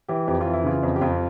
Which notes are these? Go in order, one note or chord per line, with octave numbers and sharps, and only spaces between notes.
E3 G4
F2 G4
E3 F4
E4
C#3 F4
F2
G4
F2 F4